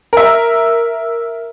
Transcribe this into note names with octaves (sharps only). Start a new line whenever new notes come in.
A#4 E5